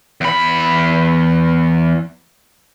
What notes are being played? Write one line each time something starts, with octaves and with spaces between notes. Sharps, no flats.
E2 B5